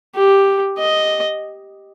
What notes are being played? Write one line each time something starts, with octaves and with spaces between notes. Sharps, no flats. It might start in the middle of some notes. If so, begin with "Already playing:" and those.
G4
D#5